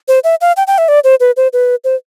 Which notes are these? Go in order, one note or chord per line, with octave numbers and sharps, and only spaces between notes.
C5
E5
F5
G5
G5
E5
D5
C5
B4
C5
B4
C5